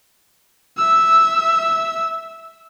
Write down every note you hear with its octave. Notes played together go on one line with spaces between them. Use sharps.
E5 E6